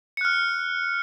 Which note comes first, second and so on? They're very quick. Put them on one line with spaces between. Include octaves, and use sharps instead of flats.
C#7 F#6 F6